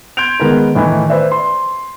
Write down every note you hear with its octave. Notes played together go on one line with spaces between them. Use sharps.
C6 G6 G#6 D7 F7
D#3 G#3 B3 A#4 B4
A2 D#3 E3 A3
B4 C5 D5 E5
C6